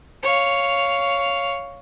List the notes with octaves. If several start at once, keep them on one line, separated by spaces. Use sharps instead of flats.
C#5 F5